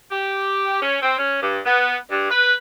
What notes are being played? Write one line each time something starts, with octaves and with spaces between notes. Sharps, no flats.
G4
C#4
C4
C#4
G2
B3
G2
B4